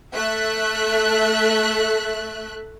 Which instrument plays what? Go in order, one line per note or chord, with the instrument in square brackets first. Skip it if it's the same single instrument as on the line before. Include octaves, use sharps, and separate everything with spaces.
[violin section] A3 E5 F#6